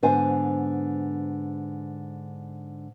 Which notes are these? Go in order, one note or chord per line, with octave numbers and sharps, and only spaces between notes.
G#2 D3 B3 C5 G#5